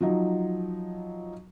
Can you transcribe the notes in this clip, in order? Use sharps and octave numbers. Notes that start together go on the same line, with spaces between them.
F3 F#3 D#4